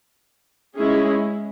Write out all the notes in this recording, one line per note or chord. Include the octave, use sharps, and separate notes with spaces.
G#3 C#4 E4 G#4